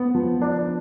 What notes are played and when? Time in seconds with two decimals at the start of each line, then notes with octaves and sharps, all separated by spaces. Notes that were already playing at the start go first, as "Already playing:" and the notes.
Already playing: B3
0.15 F3
0.41 D4